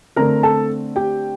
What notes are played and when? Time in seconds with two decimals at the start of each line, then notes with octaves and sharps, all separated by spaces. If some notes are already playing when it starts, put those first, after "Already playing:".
0.16 D3 A3 C4 A#4 A#5
0.43 A4 A5
0.96 G4 G5